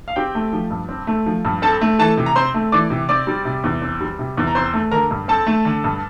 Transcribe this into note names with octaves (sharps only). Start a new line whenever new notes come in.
F5
C4 G4 G5
A3
F3
G2
C4
A3
F3
G2
C4 A4 A5
A3
E3 A4 A5
C3
A#5
C4 C5 C6
A3
E3 D5 D6
C3
C4 D5 D6
G3
C3
E2
C4
G3
C3
E2
A#5
C4 C5 C6
A3
D3 A#4 A#5
G2
C4 A4 A5
A3
D3
G2